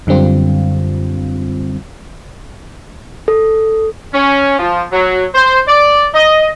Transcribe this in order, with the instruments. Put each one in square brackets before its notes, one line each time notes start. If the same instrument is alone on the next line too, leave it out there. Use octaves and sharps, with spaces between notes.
[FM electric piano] F#2 D3 G3 C4 F4
[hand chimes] A4
[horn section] C#4
F3
F#3
C5
D5
D#5